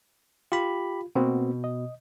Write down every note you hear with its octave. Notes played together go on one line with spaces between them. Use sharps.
F4 G4 B5
B2 A#3 C4 F#4
D#5